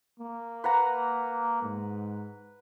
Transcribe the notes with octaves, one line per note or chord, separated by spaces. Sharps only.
A#3
B4 F#5 A#5
G#2